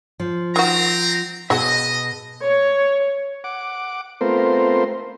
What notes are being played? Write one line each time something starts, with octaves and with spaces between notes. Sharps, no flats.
F3
D#3 C4 F#4 A#5
B2 F#3 G#4 D#5 F#5 A5
C#5
F#5 D6
A3 B3 C4 F4 A#4 C5